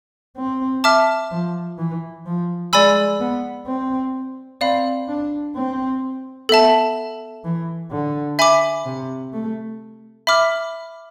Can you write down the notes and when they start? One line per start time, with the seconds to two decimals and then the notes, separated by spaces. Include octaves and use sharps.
0.37 C4
0.84 E5 A5 D6 F6
1.31 F3
1.78 E3
2.26 F3
2.73 G#3 D5 G#5 B5 E6
3.20 B3
3.67 C4
4.61 C4 D5 F5 B5
5.09 D4
5.56 C4
6.49 B3 A4 E5 A5
7.44 E3
7.91 D3
8.39 E5 G#5 B5 D6
8.86 C3
9.33 A3
10.27 E5 B5 D6 F6